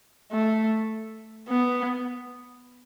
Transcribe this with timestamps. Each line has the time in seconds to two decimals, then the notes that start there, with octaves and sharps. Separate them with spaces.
0.32 A3
1.49 B3